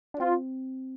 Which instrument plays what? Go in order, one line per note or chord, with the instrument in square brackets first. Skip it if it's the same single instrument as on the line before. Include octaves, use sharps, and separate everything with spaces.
[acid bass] D4
[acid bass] C4 [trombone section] F4